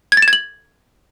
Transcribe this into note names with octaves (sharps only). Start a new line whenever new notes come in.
G#6
A6
E7
G#6
F#7